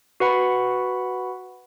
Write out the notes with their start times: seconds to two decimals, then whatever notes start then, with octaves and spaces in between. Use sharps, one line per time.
0.20 F#4 B4 F#5 B5